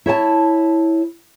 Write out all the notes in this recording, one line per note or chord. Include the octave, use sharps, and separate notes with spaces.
E4 C#5 G5 A5